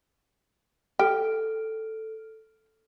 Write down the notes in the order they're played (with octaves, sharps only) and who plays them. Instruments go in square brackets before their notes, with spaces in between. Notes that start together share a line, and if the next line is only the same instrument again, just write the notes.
[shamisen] G4 [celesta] A4 F6 D7